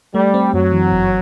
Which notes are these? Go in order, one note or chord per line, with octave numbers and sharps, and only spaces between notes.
G3 A3
C4
F#2 F#3
E3
G1